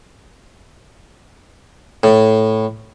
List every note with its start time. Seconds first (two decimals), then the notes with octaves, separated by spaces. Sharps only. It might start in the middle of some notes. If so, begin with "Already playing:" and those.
2.03 A2